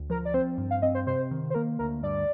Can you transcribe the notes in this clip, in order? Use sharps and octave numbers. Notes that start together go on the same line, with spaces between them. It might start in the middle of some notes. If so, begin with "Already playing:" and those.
Already playing: D2
F3 A#4
D5
C4 C5
G2
F5
C4 D#5
C5
C3 C5
D#3
C5
A#3 A#4
D2 A#4
G2 D5